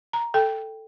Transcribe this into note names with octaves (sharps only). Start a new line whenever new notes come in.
A#5
A4 G5